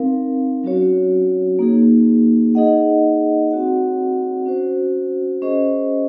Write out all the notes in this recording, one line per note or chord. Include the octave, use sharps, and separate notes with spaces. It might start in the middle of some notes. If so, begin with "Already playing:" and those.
Already playing: C4 D#4 A#4 F5
F#3 C#4 F#4 C#5
A#3 D#4 G#4
D#4 G#4 D#5 F#5
C4 F#4 C#5 F#5
C#4 F#4 C5
C#4 G#4 C5 D#5